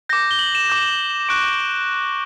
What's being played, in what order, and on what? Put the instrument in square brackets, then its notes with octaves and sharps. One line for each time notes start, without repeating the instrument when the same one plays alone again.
[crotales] D6 G6 A#6
G7
F#7
E7
D6 G6
C#6 F#6 D7